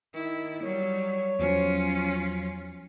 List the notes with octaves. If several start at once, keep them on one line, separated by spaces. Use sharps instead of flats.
D#3 E4
F#3 G3 C#5
E2 F3 F#3 C#4 F4